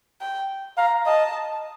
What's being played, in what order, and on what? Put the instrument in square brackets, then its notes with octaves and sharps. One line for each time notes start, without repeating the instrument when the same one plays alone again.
[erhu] G5
[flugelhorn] F5 [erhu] A#5
[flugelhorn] D#5 [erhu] A5